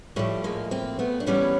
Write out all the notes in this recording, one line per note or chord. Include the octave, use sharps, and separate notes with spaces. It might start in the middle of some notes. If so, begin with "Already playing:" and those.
A2 F3 G3 A3
G#3 A#3
A#3 C4
A3 B3
D4
A2 E3 G3 B3 C#4